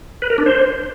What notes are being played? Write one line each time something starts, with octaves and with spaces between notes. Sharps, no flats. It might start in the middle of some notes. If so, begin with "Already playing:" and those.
B4
A#4
D4
C5